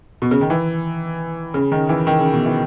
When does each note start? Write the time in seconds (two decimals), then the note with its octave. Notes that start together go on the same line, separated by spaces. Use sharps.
0.22 B2
0.31 C#3
0.41 D#3
0.50 E3
1.54 C#3
1.72 D#3
1.89 E3
2.07 D#3
2.19 C#3
2.33 B2
2.46 E3